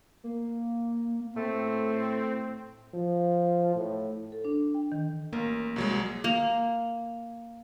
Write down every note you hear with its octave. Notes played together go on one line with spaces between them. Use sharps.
A#3
A2 A3 C4
F3
A2
A4
D4
G5
D#3
A1 A#3
C2 F#3 G#3
A#3